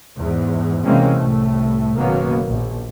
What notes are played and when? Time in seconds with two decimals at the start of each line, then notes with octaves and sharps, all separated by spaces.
0.17 E2 G#2
0.85 C3 E3 G#3 A#3 C4 C#4
1.16 C2 A2 A3
1.96 F#1 B2 D#3 F#3 A#3 B3
2.46 A#1